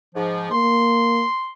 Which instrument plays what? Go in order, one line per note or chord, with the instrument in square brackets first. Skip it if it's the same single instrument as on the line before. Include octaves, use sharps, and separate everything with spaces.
[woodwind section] G#2 F3
[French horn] A#3 [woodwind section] C6